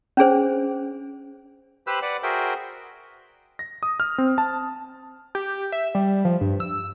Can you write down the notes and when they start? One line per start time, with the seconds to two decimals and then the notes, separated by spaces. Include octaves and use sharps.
0.17 C#4 D4 G#4 C5
1.87 G4 B4 C5 B5 E6 F#6
2.02 B4 D5 F#5
2.23 F#4 G#4 A#4 C5 E5 G5
3.59 A#6
3.83 D#6
4.00 F6
4.18 C4
4.38 A5
5.35 G4
5.72 E5
5.95 G3
6.25 F3
6.41 G2
6.60 E6